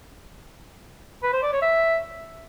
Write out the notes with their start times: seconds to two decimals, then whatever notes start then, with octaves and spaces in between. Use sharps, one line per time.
1.23 B4
1.33 C5
1.43 D5
1.52 C#5
1.62 E5